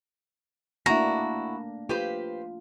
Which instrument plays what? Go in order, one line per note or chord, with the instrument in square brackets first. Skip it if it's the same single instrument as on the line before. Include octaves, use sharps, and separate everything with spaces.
[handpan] A3 A#3 D4 [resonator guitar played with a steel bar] E4 F#4 [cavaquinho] A#5
[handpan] F4 [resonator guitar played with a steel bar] G4 B4 C5